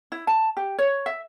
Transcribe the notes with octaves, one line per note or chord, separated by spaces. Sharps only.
E4
A5
G4
C#5
E5